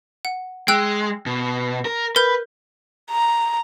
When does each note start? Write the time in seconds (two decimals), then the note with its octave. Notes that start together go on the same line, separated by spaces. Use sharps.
0.25 F#5
0.68 G#3 G5 E6 F#6
1.26 B2
1.85 A#4
2.16 A#4 B4 G6
3.11 A#5